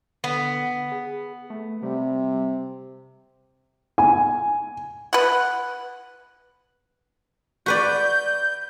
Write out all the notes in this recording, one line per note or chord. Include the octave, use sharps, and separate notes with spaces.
D3 B3
G#4
A3
C3 G3
G#5
B4 F#5
F#4 B4 D5 G6